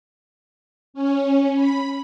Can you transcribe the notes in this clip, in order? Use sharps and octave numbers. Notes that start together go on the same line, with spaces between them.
C#4
B5